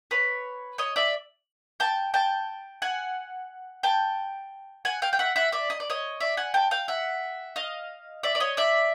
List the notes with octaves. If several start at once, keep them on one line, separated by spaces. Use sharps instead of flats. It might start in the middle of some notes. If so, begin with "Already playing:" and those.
B4 C#5
C#5 D#5
D5 E5
G5 A5
G5 A5
F#5 G#5
G5 A5
F#5 G#5
F5 G5
G5
E5 F#5
E5 F#5
D5 E5
D#5
D5
C#5 D#5
D5 E5
F#5 G#5
G5 A5
F5 G5
E5 F#5
D#5 F5
D5 E5
D5
C#5 D#5
D5 E5